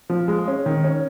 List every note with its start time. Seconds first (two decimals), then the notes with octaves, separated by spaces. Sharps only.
0.10 F3
0.28 G#3
0.48 C#4
0.66 D#3
0.84 C#4